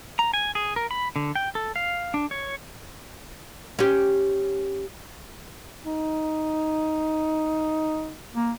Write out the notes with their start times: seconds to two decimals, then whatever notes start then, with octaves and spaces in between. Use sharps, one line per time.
0.19 A#5
0.34 G#5
0.55 G#4
0.76 A#4
0.91 B5
1.16 D3
1.36 G5
1.55 A4
1.76 F5
2.14 D4
2.31 C#5
3.79 C#4 G4
5.85 D#4
8.35 A#3